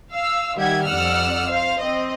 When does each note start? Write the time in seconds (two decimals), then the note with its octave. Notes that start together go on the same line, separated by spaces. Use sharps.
0.12 F5 E6
0.56 D#3 G3 G4 E5 F#5 G#6
0.86 F2 D5 F#5 E6 F6
1.49 C5 F5
1.81 C4 D#5